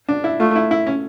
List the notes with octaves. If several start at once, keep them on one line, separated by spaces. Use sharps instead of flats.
D4
E4
A3 F4
E4
E4
C#4